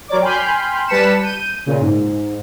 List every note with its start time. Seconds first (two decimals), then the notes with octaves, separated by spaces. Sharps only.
0.08 F#3 A#4 C#5 D5 D6
0.22 G5 G#5 B5 C6 F6 G6
0.88 G3 B4 A5 B6 C#7 E7
1.23 G6 D#7
1.66 A#2 C#3
1.81 G#2